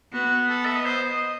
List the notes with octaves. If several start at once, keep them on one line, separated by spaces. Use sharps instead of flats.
B3 F#4
A4
E5
D#5
C5
D#5